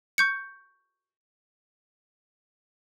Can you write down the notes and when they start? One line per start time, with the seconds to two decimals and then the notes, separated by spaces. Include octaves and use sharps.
0.18 C#6 G6 C#7